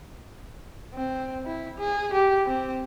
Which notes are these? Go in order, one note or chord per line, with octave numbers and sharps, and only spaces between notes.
C4
E4
G#4
G4
C4